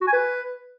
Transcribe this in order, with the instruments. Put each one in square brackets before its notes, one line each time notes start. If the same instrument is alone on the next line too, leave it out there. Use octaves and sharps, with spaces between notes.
[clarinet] F#4
G#5
B4